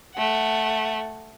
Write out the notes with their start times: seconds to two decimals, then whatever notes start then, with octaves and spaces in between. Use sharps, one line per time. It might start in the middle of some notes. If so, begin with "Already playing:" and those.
0.16 A3 F#5